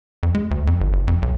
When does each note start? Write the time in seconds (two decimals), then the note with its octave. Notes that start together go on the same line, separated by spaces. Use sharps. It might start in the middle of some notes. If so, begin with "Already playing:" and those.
0.23 F2
0.35 G#3
0.51 D2
0.67 F2
0.81 G1
0.93 F#1
1.08 F2
1.22 B1